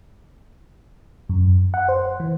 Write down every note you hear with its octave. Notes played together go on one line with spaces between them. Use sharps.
F#2
F#5
C5
E3